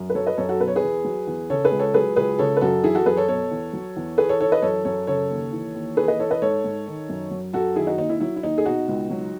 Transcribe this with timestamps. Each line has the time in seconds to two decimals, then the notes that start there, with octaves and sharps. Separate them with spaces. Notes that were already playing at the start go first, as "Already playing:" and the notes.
Already playing: F#2
0.10 B4
0.15 F#3 A4 C#5
0.26 B4 D#5
0.37 F#2 A4 C#5
0.49 F#4 A4
0.60 B2 B4
0.68 C#5
0.76 G#4 B4
0.83 E2
1.05 F#3
1.27 E2
1.50 C#3 A4 C#5
1.64 G#4 B4
1.71 C#2
1.79 A4 C#5
1.94 F#3 G#4 B4
2.16 C#2 G#4 B4
2.39 C#3 A4 C#5
2.57 B4
2.61 F#2 F#4 A4
2.84 E3 E4 G#4
2.95 F#4 A4
3.06 F#2 G#4 B4
3.17 A4 C#5
3.28 B2 A4 C#5
3.51 E2
3.73 F#3
3.96 E2
4.18 E3 G#4 B4
4.29 A4 C#5
4.40 E3 A4 C#5
4.52 B4 D#5
4.62 F#2 A4 C#5
4.85 F#2 A4 C#5
5.07 C#3 A4 C#5
5.30 D#2
5.53 E3
5.74 D#2
5.97 E3 G#4 B4
6.08 B4 D#5
6.19 E3 A4 C#5
6.31 B4 D#5
6.42 G#2 A4 C#5
6.64 G#2
6.87 D#3
7.09 F#2
7.31 F#3
7.53 F#2 F#4 A4
7.76 D#3 E4 G#4
7.87 D#4 F#4
7.98 D#2 D#4
8.09 E4
8.20 F#3 E4
8.36 E4
8.43 D#2 D#4
8.58 G#4
8.66 B2 D#4 F#4
8.88 C#2
9.10 F#3